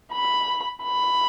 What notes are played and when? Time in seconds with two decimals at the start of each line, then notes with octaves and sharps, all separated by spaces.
0.12 B5
0.83 B5